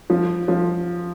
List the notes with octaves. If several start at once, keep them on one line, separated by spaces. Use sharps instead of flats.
F3
F3